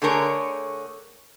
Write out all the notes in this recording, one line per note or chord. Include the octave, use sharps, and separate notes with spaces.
D3 A3 G#4 A#4 C#5